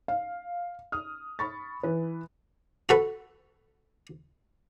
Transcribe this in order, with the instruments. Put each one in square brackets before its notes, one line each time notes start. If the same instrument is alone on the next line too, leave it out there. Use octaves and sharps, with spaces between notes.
[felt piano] F5
D#6 F6
B5 C#6 A6
E3 B4
[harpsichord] F#4 A4 B4